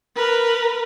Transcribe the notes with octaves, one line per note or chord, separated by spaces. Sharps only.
A#4 B4